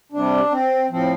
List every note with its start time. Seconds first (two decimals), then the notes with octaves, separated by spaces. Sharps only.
0.12 C3 G3 D4
0.51 C4
0.90 A2 F3 C4